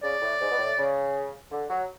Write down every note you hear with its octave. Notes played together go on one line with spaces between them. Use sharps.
C#3 D5
A2
G#2
B2
A2
C#3
D3
F#3